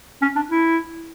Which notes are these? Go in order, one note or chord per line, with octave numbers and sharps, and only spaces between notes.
C#4
D4
E4